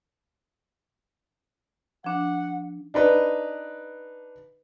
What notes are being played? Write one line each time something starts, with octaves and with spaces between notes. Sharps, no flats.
F3 D4 F#5
D4 D#4 B4